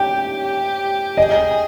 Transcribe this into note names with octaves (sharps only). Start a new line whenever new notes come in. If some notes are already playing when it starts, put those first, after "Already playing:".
Already playing: G4 G5
G4
G#4 D#5